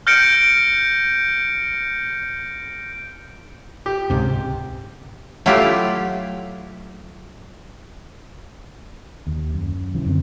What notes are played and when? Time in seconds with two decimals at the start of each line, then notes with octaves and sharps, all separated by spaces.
0.07 F6 G6 A#6 C#7 D7
3.86 G4
4.10 C#2 G#2 C3
5.46 F#3 A3 E4 F4 G4
9.27 D#2
9.54 F#2
9.95 A#1 C#3 E3
10.06 F#2 D3 C4